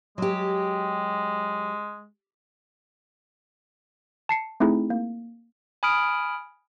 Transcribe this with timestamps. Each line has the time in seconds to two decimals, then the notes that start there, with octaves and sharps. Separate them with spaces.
0.18 F#3 G#3 G4
4.29 A5 C7 C#7
4.60 A3 C4 D#4 E4 G#4
4.90 A#3
5.83 G#5 B5 D#6 F6 D7